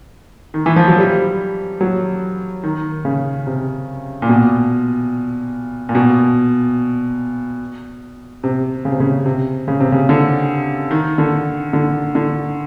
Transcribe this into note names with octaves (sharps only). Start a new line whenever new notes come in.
D#3
E3
F3
F#3
G3
F#3
D#3
C#3
C3
A#2
B2
A#2
B2
C3
C#3
C3
C#3
C3
C#3
C3
C#3
D3
D#3
D3
D3
D3